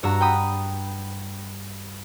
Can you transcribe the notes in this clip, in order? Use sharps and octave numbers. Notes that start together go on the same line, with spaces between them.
G2 F#4 A#5 E6
G5 B5 D#6